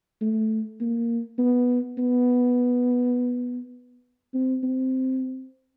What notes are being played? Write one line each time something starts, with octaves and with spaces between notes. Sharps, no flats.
A3
A#3
B3
B3
C4
C4